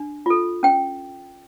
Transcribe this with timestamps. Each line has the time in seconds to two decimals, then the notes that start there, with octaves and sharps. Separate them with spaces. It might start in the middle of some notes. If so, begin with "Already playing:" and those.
Already playing: D4
0.26 F4 A4
0.63 C#4 G5